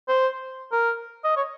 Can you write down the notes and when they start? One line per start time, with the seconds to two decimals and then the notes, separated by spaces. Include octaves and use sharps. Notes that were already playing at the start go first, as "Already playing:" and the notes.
0.08 C5
0.72 A#4
1.24 D#5
1.37 C#5